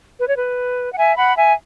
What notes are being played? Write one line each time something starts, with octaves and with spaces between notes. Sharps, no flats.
B4
C#5
B4
F#5
E5 G#5
F#5 B5
E5 G#5